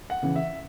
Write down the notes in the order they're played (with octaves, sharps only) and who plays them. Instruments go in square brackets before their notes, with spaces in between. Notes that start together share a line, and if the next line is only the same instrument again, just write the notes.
[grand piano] F#5
C#3 E3
E5